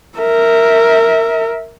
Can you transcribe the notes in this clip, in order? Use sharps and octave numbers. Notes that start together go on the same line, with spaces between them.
A#4 E5